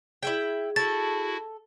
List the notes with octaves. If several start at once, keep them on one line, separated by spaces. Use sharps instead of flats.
E4 G#4 E5 G5
E4 F#4 A4 A6